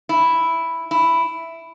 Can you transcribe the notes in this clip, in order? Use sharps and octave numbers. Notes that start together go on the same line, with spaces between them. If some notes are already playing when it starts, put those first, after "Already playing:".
E4
E4